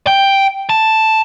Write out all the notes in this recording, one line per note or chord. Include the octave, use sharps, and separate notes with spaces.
G5
A5